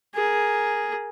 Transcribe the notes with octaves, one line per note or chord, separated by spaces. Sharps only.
G#4 A#4